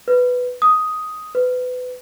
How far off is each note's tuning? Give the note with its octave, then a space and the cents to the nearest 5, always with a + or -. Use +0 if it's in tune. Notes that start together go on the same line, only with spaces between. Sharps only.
B4 +5
D#6 +5
B4 +25